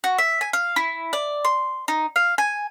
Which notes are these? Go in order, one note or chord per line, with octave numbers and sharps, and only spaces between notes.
F#4
E5
G#5
F5
E4
D5
C6
D#4
F5
G#5